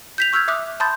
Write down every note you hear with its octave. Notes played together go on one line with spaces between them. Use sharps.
G6 B6 F7
C#6 E6 F6 G6 G#6
E5 D6 D#6 F#6
A5 B5 C6 D#6 G6 A6